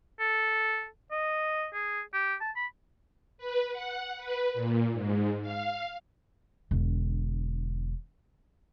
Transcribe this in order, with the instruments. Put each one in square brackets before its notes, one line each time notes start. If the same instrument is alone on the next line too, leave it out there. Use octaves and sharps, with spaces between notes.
[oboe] A4
D#5
G#4
G4
A5
B5
[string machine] B4
F#5
B4
A#2
G#2
F5
[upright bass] E1 D3